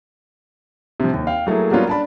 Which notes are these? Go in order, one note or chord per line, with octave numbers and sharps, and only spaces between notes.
C3 F3
D#2
F5 G5
F#3 A3 A#3 E4 G#4
F#3 G3 A#3 B3 C#4 F4
D4 A5 B5